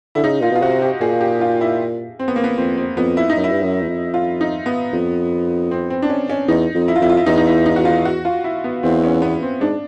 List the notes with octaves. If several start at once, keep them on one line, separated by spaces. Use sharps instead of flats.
D3 E4
C#3 D#4
A#2 F4
B2 F4
C3 F#4
G4
A#2 G#4
G4
F4
E4
C4
B3
A#3
B3
F2 C4
C4
F2 B3
E4
D#4
F#2
E4
G2
F#2
E2
F2
F4
D#4
B3
F2
C4
C4
D4
C#4
C#4
E2 D#4
F2
E4
F4
F2 E4
F4
E4
E2 D#4
D#4
E4
D#4
F#4
F4
F#4
F4
E4
B3
E2 C4
C#4
B3
C4
G#2 D4